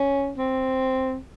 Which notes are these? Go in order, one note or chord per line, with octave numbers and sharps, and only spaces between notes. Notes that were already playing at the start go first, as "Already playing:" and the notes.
Already playing: C#4
C4